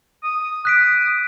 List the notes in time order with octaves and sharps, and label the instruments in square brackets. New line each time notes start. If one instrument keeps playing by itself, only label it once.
[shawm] D#6
[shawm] D#6 [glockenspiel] F#6 B6 D7